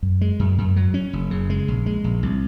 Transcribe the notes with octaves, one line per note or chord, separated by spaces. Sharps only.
F#2
G#3
F#2
F#2
F#3
C#4
F#1
C#3
G#3
A#1
G#3
A#1
C2